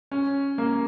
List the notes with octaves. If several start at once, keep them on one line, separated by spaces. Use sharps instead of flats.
C#4
A#3